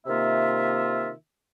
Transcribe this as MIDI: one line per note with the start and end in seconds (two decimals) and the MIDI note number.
0.06 1.11 48
0.06 1.11 51
0.06 1.11 58
0.06 1.11 65
0.06 1.11 76